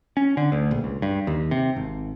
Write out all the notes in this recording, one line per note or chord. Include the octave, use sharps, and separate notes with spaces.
C#4
D3
D2
A#1
C#2
G2
D#2
C3
G#1